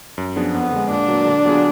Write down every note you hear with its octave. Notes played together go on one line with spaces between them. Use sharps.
F#2
F3 B3 D4 G#4
F2 B3
D3 G#3
A#2 D4
F#3 A#3
D3
F#3 B3 F4 G#4